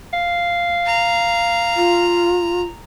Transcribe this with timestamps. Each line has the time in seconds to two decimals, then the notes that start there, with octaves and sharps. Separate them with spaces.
0.13 F5
0.86 A#5
1.77 F4